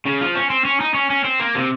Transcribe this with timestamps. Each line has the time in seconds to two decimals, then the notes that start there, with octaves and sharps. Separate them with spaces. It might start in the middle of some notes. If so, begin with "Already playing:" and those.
0.06 C#3
0.21 F3
0.35 C#4
0.50 C4
0.65 C#4
0.80 D#4
0.94 C#4
1.10 C#4
1.24 C4
1.40 A#3
1.55 C3